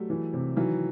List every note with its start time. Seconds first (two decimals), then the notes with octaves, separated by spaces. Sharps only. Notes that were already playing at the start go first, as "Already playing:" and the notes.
Already playing: F#3 G3 A3
0.10 E3
0.33 C3
0.56 D#3 E3 F#3